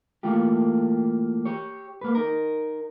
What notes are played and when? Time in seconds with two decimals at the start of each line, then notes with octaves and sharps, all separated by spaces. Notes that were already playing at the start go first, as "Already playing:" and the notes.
0.23 E3 A3 A#3 F4 G4
1.45 G4 C#5
2.01 A#3 B4
2.15 D#4 A#4